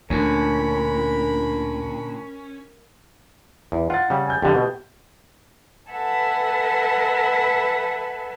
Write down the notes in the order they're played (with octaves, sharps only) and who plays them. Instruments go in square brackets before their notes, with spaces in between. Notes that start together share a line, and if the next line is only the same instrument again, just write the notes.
[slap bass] D2 [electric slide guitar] A#2 D3 [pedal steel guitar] C#4 [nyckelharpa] A#4 B5
[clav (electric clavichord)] E2
[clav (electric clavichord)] F4 [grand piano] F#5 A6
[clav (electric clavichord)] C#3 G3
[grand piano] G#5 G6
[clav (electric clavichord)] F2 D3 G3 [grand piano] G4
[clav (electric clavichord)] B2
[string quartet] A4 B4 E5 F#5 G#5 A5